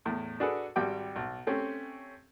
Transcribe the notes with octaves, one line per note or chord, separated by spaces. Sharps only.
E2 A2
D4 F#4 G#4 A4 B4
G#1 G3 F#4 G4 G5 D6
B1
A3 C4 C#4 G4